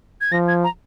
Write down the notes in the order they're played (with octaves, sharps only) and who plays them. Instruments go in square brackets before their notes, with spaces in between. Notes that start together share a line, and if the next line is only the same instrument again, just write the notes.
[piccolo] G#6
[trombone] F3 [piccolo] A#6
[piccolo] G#6
A#5